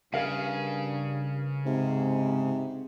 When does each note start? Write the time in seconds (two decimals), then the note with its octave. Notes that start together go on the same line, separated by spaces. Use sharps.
0.14 G2 C#3 A#4 F5
1.66 G#2 C3